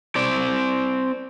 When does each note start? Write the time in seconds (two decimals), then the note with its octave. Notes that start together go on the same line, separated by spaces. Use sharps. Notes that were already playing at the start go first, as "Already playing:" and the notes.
0.16 C4 D5